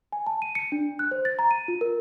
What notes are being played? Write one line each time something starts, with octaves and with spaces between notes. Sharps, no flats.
G#5
A5
D#7
C#7
D4
F#6
C5
A6
A#5
D#7
F4
A#4